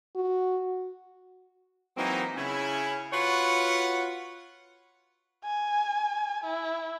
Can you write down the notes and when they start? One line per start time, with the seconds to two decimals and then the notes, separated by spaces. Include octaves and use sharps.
0.16 F#4
1.97 E3 F#3 A#3 C4 D#4
2.36 C#3 C#4 E4
3.13 F4 F#4 B4 C#5 F5 F#5
5.44 G#5
6.44 E4